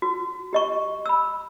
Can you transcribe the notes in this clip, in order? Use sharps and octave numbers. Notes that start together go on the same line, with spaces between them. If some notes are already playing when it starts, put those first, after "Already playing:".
F#4
G4 D#5 C#6
B5 E6